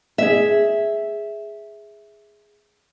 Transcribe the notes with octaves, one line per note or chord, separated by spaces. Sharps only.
G#4 E5